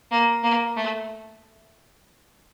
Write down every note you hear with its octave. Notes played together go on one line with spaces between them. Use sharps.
A#3
A#3
A3